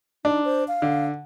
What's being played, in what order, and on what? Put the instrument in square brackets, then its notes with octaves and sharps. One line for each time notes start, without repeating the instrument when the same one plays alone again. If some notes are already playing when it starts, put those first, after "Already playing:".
[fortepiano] D4 [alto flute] D#4
[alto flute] C5
F5
[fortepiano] D3